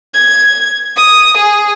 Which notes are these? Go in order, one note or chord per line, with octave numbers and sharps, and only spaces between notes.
G#6
D#6
G#4